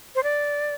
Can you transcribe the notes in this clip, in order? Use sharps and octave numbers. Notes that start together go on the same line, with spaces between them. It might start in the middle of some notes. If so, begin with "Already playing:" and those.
C5
D5